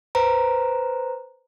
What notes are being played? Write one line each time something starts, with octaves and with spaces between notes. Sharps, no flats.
B4 C5 A#5